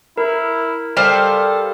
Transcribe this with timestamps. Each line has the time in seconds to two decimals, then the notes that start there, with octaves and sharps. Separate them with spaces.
0.18 E4 A#4
0.97 G3 A4 C5 F5